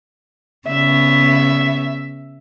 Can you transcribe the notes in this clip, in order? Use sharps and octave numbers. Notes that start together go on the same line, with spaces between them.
C#3 B3 E5